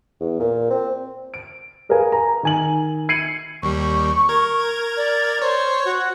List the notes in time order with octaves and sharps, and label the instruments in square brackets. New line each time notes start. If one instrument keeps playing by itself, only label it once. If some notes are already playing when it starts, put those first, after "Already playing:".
[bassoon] E2
A#2
C4
[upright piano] D7
G#4 A#4 B4 F5 G#5
A#5
D#3 G#5 F#7
G#6 C7 C#7 D#7 F#7
[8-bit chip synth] D#2 G3 [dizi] C#6
[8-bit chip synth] A#4 G#6
[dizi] D5
[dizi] C5 [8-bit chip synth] C#5
[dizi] F#4